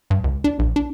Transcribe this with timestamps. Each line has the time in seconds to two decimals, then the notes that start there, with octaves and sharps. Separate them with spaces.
0.10 G2
0.24 C#2
0.44 D4
0.59 A#1
0.76 D4